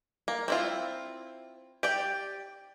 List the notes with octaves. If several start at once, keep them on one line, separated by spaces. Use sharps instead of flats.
A#3
C4 E4 F4
G4 D5 G5